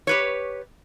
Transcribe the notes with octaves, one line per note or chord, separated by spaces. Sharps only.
G4 B4 C#5